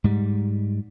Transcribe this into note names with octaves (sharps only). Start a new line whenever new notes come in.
G#2 G3